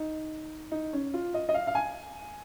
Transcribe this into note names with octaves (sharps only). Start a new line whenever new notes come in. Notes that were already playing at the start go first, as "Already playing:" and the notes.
Already playing: D#4
D#4
C#4
F4
D#5
D#5
F5
F5
G#5